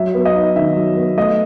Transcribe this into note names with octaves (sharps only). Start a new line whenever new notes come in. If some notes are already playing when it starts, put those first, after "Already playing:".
Already playing: F#3 E5
B3
D#5
D#4
D#3 E5
F#3
B3
A3 D#5